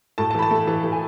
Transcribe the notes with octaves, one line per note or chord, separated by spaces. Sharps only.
A2 A5
A5
E3 B5
A5
A3
E3 A5
E3
G#5